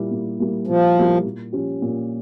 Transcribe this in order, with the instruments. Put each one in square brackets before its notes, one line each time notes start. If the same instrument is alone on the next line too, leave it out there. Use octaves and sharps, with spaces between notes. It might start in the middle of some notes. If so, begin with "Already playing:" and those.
Already playing: [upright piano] A#2 G3 A#3 E4
A#2
G3 A#3 E4
[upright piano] A#2 [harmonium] F3
[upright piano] G3 A#3 E4
A#2
F3 C#4 G4
A#2